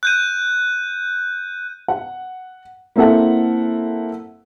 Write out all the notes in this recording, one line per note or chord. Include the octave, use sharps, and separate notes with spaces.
F#6 G6 D#7
F#5
A#3 C4 E4 A4 E5 F#5